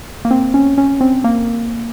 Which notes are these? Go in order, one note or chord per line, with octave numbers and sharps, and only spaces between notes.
A#3
C4
C#4
C#4
C4
A#3